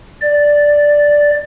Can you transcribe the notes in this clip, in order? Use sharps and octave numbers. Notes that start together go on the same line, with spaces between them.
D5